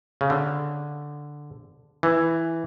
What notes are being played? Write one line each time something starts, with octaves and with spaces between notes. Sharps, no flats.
C#3
D3
E3